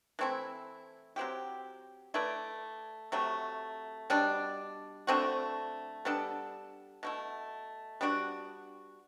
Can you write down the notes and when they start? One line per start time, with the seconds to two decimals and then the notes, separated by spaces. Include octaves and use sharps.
0.19 E3 A3 C4 E4
1.16 F#3 C4 E4 G4
2.14 A3 E4 B4 D5
3.12 C3 F#3 A3
4.10 B2 G3 D4
5.07 D3 A3 C4 F#4
6.05 G3 B3 D4 A4
7.03 B2 A3 E4
8.01 G3 B3 D4 F#4